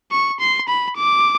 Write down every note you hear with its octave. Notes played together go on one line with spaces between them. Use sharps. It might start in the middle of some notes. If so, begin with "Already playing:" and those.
C#6
C6
B5
D6